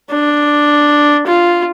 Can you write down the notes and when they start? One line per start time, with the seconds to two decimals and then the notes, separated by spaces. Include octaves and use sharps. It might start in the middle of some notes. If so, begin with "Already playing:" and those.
0.11 D4
1.27 F4